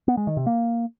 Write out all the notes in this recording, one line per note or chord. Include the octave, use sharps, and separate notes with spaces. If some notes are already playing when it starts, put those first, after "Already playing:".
B3
G#3
D#3
C3
A#3